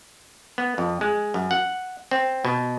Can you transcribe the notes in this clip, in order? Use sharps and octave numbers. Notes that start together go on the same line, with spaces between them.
B3
F2
G#3
F#2
F#5
C4
B2